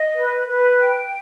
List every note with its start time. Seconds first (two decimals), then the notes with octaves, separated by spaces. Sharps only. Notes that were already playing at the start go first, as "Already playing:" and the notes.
Already playing: D#5
0.15 B4
0.47 B4
0.79 G5